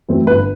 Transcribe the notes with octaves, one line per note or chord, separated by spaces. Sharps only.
F#2 E3 A3 C4
G1 B4